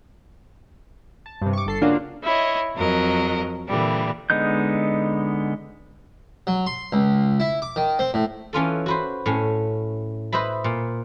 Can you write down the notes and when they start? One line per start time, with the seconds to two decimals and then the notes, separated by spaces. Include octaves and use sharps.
1.26 A5
1.42 G2 C3
1.53 C#6 D6
1.66 G1 A4 C7
1.82 C#3 A#3 D4 F4 F#4
2.23 E4 C#5 D#5
2.76 F2 F#3 A#4 D#5
3.67 A#2 D3 E3 G3
4.30 D3 G#3 B3 D#4 G6
6.47 F#3
6.66 C6
6.93 C#2
7.40 E4
7.62 D6
7.76 D#3
7.99 C4
8.14 A2
8.53 E3 C#4 F4 A4
8.86 F#4 B4 C5
9.26 A2 C#4
10.32 B4 C5 D#5 E5 B5
10.64 A#2